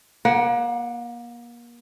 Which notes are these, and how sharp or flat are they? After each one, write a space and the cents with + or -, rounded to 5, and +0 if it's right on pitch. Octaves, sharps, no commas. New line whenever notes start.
A#3 +35 F#5 +0